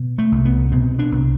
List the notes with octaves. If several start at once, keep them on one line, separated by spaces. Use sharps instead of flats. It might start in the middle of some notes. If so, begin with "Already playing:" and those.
Already playing: B2
A3
C2
B3
B2 C4
D4
C2